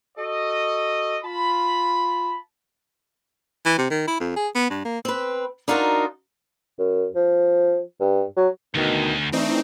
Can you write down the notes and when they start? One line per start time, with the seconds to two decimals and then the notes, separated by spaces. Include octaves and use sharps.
0.18 F#4 A4 D#5
1.24 F4 A5 B5
3.66 E3
3.78 C3
3.91 D#3
4.08 E4
4.20 F2
4.36 G#4
4.55 B3
4.70 G2
4.85 A#3
5.05 C4 B4
5.68 D4 D#4 F4 F#4 A#4
6.79 F#2
7.15 F3
8.00 G2
8.37 F#3
8.75 D2 B2 D#3
9.32 E3 A3 C4 D4 D#4